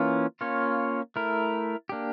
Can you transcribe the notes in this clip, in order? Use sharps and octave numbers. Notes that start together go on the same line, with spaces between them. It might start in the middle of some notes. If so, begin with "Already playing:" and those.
Already playing: E3 A#3 C#4 F4
A#3 C#4 F4 C#5
A3 E4 A#4
A#3 D4 G4